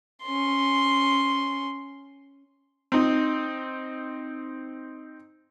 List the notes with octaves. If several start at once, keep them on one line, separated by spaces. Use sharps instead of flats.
C#4 C6
C4 D#4